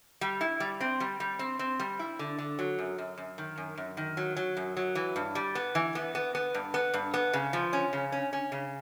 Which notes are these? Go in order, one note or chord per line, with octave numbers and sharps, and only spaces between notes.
G3
E4
G3
C4
G3
G3
C4
C4
G3
E4
D3
D3
F#3
F#2
F#2
F#2
D#3
F#2
F#2
D#3
F#3
F#3
F#2
F#3
E3
G2
G3
B3
E3
B3
B3
B3
G2
B3
G2
B3
C#3
F3
C#4
C#3
C#4
C#4
C#3